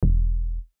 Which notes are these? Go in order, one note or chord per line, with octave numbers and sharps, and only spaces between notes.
E1